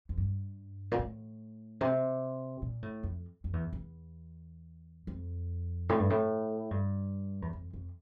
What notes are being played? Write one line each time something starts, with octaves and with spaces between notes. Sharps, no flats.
F2
G2
A#2
A2
C3
A#2
A2
F2
F2
E2
E2
F2
A2
G2
A2
G2
E2
F2
F2